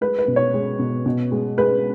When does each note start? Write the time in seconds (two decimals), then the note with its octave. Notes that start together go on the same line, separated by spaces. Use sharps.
0.01 G#3 B4
0.19 B4
0.28 B2
0.36 C#5
0.54 G#3
0.79 B2
1.06 B2
1.32 G#3
1.58 G#3 B4